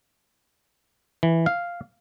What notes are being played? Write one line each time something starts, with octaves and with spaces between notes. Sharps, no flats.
E3
F5